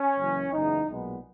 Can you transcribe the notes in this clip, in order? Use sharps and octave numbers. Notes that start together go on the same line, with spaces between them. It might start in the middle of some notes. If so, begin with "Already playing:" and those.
Already playing: C#4
F#1 F#2 E3
F#1 E2 C#3 D#4
B1 A#2 G#3 B3